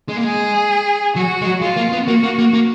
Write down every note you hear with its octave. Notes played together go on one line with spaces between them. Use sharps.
G#3
A#3
G#3 G#4
F#3 F#4
G#3
F#3
G#3 F4
A#3
B3
A#3 F#4
A#3
A#3
A#3